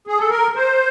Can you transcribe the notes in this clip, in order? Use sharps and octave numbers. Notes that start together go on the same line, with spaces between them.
G#4
A4
A#4
C5